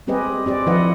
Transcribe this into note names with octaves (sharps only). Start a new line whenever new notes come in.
G3 C4 G4 G#4 B4 D#5
C4 G4 D5
D3 F3 E4 B4 D#5 F#5